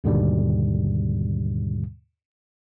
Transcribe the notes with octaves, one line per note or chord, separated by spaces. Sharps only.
D#2 G#2 B2 D3 D#3 G3